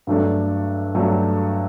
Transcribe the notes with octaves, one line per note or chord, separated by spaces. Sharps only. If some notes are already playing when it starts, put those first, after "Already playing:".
G2 F#3 A3 D4 A4
G2 F#3 A3 D4 A4